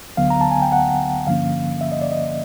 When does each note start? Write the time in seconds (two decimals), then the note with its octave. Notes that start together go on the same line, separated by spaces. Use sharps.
0.17 D2 D3 F#3 B3 F5
0.30 A#5
0.41 A5
0.51 G#5
0.62 G5
0.72 F#5
1.27 G2 D3 F3 A#3 C#4 F5
1.81 E5
1.92 D#5
2.02 D5
2.12 D#5